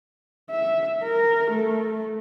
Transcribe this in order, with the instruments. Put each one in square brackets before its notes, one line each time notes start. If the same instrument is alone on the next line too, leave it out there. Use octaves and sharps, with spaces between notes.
[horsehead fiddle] E5
A#4
A3